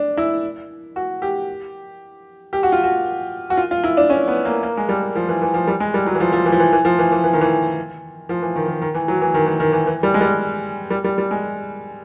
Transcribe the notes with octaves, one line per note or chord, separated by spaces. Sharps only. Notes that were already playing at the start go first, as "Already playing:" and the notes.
Already playing: D4
E4
F#4
G4
G4
F#4
F4
F#4
F#4
F4
F4
E4
D4
C#4
B3
A#3
A#3
G#3
G3
F3
E3
E3
F3
G3
G#3
G3
F#3
E3
F3
F3
E3
F3
E3
E3
F3
E3
E3
E3
D#3
E3
F3
E3
D#3
D#3
D#3
E3
F#3
E3
D#3
E3
D#3
E3
E3
G3
G#3
G3
G3
G3
G3
G#3